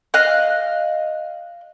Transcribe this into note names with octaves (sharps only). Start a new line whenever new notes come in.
D#5 F5 F#6